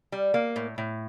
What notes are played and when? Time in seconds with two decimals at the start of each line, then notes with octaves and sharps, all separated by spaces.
0.12 G3
0.34 A#3
0.56 A2
0.78 A2